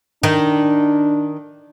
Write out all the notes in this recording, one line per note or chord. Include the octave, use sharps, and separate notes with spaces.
D#3 D4